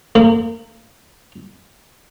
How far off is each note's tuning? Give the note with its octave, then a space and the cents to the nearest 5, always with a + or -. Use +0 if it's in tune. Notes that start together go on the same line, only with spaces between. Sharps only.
A#3 -30